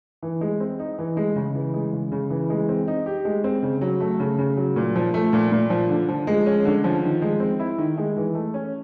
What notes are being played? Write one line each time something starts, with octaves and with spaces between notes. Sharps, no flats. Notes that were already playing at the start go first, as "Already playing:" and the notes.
E3
G#3
C4
D#4
E3
G#3
C#3
E3
G#3
C#3
C#3
E3
G#3
C4
D#4
G4
G#3
C4
C#3
F#3
A3
C#3
C#3
F#3
A#2
F3
A3
A#2
A#2
F3
D3
F3
G#3
C#4
D3
F3
D#3
G#3
C4
E4
D#3
G#3
E3
A3
C#4